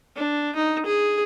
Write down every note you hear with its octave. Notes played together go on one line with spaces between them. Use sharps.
D4
D#4
G#4